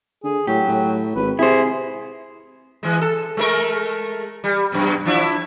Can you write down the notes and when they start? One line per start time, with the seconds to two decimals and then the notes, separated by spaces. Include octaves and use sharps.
0.24 D3 G#4
0.47 A2 F#3 G4
0.68 A2
1.16 G#1 B4
1.39 C3 E4 G#4 C5
2.83 E3 G#3
3.01 A4
3.37 G#3 A3 A#4
4.44 G3
4.72 F#2 B2
5.05 F3 D4 E4